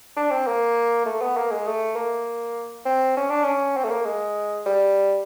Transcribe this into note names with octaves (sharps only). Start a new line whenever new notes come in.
D4
C4
A#3
A3
B3
A#3
G#3
A3
A#3
C4
C#4
D4
C#4
C4
A3
A#3
G#3
G3